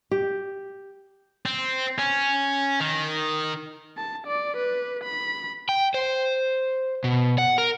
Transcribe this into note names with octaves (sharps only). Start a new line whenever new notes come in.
G4
C4
C#4
D#3
A5
D5
B4
B5
G5
C5
B2
F#5
A#4